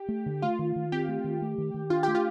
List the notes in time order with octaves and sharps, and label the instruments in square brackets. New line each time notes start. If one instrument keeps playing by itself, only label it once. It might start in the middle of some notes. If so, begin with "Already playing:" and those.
Already playing: [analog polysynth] G4
[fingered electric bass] A3
D3
[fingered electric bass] A3 [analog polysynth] F4
[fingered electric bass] D#3
D#3
[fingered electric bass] C4 [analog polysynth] G4
[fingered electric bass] A3
D#3
A3
D#3
D#3
[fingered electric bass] D4 [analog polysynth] F4
[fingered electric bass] A3 [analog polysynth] G4
[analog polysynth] F4